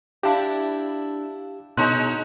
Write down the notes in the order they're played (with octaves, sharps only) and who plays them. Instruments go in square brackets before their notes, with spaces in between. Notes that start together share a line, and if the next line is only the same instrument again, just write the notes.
[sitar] D4 E4 [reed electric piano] G4 [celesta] E5 F5 A5
[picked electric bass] B2 [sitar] G#3 D#4 C#5 [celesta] A#5 C6 [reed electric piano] F#6